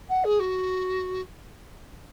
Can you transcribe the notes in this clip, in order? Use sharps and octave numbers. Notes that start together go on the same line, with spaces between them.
F#5
G#4
F#4